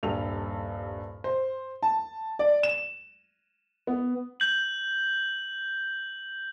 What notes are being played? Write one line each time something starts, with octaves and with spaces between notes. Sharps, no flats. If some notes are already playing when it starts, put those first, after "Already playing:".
D#1 G2 A4 F7
C5
A5
D5
E7
B3
G6 F#7